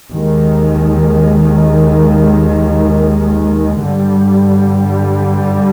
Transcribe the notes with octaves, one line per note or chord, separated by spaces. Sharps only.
D#2 D#3 G#3
G2 D3 G3